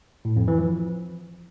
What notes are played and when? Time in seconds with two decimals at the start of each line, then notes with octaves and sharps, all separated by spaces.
0.25 A2
0.36 F2
0.48 E3
0.59 F3